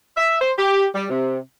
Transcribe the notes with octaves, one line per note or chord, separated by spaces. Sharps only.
E5
C5
G4
G3
C3